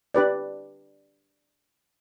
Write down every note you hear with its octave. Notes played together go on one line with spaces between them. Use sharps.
D4 G4 B4 D5